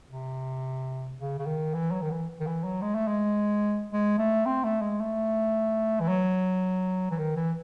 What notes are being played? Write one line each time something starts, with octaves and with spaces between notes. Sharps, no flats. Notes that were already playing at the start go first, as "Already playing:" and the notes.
C3
C#3
C#3
D#3
E3
F#3
D#3
E3
D#3
E3
F#3
G#3
A3
G#3
G#3
A3
C4
A3
G#3
A3
E3
F#3
E3
D#3
E3